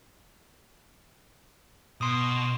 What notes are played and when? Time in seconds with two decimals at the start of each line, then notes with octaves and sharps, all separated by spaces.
2.01 B2 C6 D#6